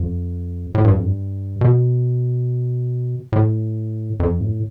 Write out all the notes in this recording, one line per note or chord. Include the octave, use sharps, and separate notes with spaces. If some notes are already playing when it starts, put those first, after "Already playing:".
Already playing: F2
A2
G2
F2
G2
B2
A2
F2
A2